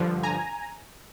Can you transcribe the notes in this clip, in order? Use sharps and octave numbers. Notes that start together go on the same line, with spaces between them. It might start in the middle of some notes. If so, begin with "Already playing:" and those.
Already playing: G2 D3 F3
G#5 A#5